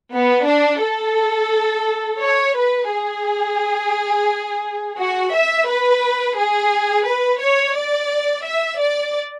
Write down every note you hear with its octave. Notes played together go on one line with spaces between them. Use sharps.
B3
D4
A4
C#5
B4
G#4
F#4
E5
B4
G#4
B4
C#5
D5
E5
D5